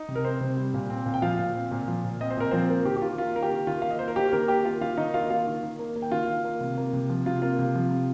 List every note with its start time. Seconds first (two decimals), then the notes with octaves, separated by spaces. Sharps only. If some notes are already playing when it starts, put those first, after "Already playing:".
Already playing: D#4 D#5
0.09 C3
0.15 A#4
0.24 C4 C5
0.41 C3
0.57 G3
0.74 A#2
0.90 C4
1.06 A#2
1.14 G5
1.22 F3 F4 F5
1.39 A#2
1.55 C4
1.71 A#2
1.88 F3
2.04 A#2
2.21 C4 D#5
2.31 C5
2.37 A#2 A#4
2.51 F3 C4 C5
2.69 A#3 A#4
2.85 D#3 G4
2.96 G4
3.02 D#3 F4
3.18 A#3 F4
3.35 A#3 A#4
3.42 G4
3.51 D#3
3.67 D#3 F4
3.82 A#3 F5
3.91 D#5
3.99 A#3 C5
4.08 A#4
4.16 D#3 G4
4.32 D#3 A#3 A#4
4.48 A#3 G4 G5
4.65 A#3 F4 F5
4.81 D#3 F4 F5
4.97 D#3 D#4 D#5
5.14 A#3 F4 F5
5.30 A#3 F4 F5
5.47 D#3
5.63 D#3
5.79 A#3
5.95 A#3
6.02 G5
6.12 D#3 F4 F5
6.28 D#3
6.44 A#3
6.61 C3
6.77 A#3
6.93 C3
7.09 F3
7.26 C3 F4
7.42 A#3 F4
7.59 C3
7.75 F3
7.91 C3